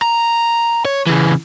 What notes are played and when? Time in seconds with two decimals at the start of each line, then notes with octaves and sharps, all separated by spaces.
0.02 A#5
0.85 C#5
1.07 C#3 E3